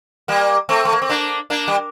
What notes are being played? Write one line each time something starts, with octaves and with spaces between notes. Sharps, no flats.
G3 A#3
A3 C4
A3
A#3
C4
A#3 D4
A#3 D4
G3